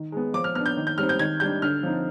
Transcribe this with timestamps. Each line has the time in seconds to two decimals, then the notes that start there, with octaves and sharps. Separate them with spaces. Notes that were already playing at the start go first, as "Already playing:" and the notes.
Already playing: D#3
0.12 G#3 B3
0.34 F3 D6
0.44 F6
0.55 B3 D4 F6
0.66 G6
0.77 D#3
0.87 G6
0.98 G3 C4 D#4 F6
1.09 G6
1.19 D#3 G#6
1.40 G3 D4 G6
1.62 D3 F6
1.83 F3 C4 D#4